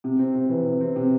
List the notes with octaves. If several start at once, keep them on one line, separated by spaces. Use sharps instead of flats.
C3
C4
C3
E3
C3
C4
C3